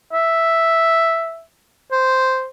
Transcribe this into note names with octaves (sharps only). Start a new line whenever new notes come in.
E5
C5